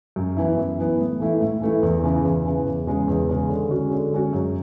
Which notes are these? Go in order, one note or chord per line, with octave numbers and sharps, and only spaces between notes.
F#2
E3 B3 E4
F#2
E3 B3 E4
A2
E3 A3 E4
A2
E3 A3 E4
E2
C#3 E3
E2
C#3 E3
E2
C#3 G#3 C#4
E2
C#3 G#3 C#4
D3
G#3 C#4 F#4
D3
G#3 C#4 F#4
F#2